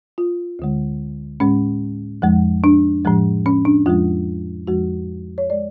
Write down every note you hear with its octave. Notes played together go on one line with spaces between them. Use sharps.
F4
D2 D3 G#3
A2 G#3 C#4
F2 F3 G#3
D4
A2 F3 G#3
C#4
D4
F2 F3 G#3 F4
F2 F3 G#3 F#4
C#5
G#3 D5